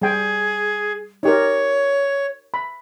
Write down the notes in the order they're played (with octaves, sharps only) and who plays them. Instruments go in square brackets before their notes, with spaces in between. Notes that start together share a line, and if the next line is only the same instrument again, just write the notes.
[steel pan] G3 G5 [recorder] G#4
[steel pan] D#4 G4 A#4 [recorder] C#5
[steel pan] B5